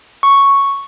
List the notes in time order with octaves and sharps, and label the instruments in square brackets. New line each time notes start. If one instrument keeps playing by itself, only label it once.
[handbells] C#6